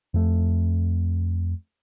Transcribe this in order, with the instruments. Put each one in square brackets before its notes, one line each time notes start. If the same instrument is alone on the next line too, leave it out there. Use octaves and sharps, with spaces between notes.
[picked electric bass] F2 A3